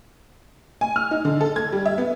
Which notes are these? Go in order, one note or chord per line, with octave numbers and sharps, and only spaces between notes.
G#5
F6
D#4
D3
A4
G#6
G3
E5
B3